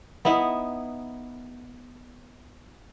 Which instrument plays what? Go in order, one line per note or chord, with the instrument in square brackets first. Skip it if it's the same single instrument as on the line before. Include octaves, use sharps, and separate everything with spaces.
[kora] B3 D#4 E4